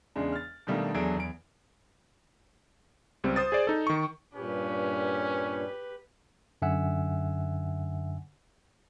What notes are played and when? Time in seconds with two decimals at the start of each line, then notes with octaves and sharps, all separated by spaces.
0.16 E2 C#3 G#3 D4
0.33 F6 A6
0.67 B2 D#3 G3 A3 A#3 D4
0.94 E2 F#3 D4 G#4 A4 D7
1.16 E2 D7
3.24 C#2 G3 C4
3.36 C5 D#6 A6
3.52 G#4 C5 D5
3.67 D#4 A4
3.87 D#3 C#6
4.35 G2 A#2 C#4 G4 B4
6.62 F#2 D3 E5 F#5 G#5 E6